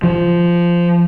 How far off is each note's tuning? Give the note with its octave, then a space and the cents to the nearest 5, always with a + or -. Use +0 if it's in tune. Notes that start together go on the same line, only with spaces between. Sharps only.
F3 -10